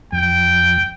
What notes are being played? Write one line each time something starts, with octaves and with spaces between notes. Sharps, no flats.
F2 G5